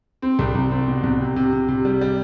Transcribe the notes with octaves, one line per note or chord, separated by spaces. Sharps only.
C4
C2
C2
C4
B2
C2
C3
C3
C3
C3
G3
G3